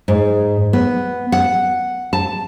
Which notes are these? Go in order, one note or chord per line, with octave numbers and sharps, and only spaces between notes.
G#2
B3
F#5
A5